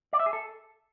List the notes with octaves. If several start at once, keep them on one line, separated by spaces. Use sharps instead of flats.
D5
E5
G#4
A4